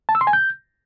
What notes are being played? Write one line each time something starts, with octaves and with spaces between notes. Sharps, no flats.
A5
E6
C6
G#5
G6